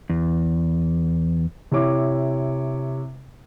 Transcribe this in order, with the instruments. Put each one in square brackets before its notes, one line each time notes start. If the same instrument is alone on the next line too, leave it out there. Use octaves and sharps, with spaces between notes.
[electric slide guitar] E2
[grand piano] C3 E4 C#5 D6